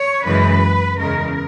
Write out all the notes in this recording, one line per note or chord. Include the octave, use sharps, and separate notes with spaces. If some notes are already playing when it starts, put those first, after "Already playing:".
Already playing: C#5
F#2 C#3 E3 G#3 B4
E2 C#3 G#3 A#4